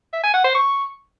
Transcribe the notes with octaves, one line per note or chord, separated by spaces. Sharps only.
E5
G#5
F#5
C5
C#6